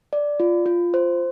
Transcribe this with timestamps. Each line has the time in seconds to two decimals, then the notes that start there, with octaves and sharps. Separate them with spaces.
0.13 D5
0.40 F4
0.66 F4
0.94 C5